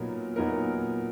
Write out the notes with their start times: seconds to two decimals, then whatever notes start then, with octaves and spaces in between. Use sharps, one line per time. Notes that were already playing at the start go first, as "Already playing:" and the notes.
Already playing: A#2 F#3 B3 D#4 A#4
0.36 A#2 F#3 B3 D#4 A#4